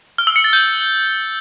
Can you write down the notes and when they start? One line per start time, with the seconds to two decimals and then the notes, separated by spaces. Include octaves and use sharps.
0.18 F6
0.27 E6
0.36 C#7
0.44 A6
0.53 G6